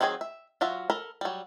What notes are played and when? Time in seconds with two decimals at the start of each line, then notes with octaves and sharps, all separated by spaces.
0.01 D#3 F#3 C4 G#4 G#5
0.21 E5
0.61 F#3 F4 F#4 E5
0.90 A4 A#4 B5
1.21 F#3 G3